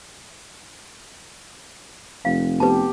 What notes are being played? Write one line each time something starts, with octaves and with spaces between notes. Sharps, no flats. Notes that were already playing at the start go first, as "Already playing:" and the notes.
F1 F5
B3 G4 B4 A5